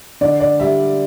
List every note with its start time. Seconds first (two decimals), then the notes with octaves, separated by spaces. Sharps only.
0.21 D3 D5
0.40 D5
0.59 G3 E5